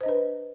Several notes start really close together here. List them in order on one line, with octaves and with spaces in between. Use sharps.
C5 D#5 D4 B4